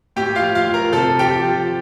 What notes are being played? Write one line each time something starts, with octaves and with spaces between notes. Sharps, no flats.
A2 G4 G5
F4 F5
F3
F4 F5
F3
A#4 A#5
C3 A4 A5
F3 G4 G5
F3